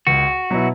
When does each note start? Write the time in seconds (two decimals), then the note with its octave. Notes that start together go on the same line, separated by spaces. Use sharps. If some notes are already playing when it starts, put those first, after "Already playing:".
0.07 C#2 F#4
0.50 B2 F#3 B3 E4